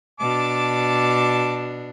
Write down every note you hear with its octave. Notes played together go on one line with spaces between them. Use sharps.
B2 D4 A5 D6